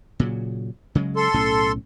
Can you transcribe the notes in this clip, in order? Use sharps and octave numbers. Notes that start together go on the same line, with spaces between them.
A#2 C#3 F#3
C#3 F#3 G#3
A4 C6
B1 A2 C#4